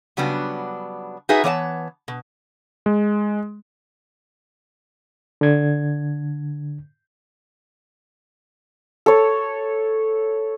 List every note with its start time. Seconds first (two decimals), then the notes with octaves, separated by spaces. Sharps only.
0.17 C#3 F#3 G3 B3 D4 F#4
1.29 D#4 F#4 G#4 B4 E5
1.44 E3 B3 C#5 D#5 A5
2.08 B2
2.86 G#3
5.41 D3 G#6
9.06 A4 C#5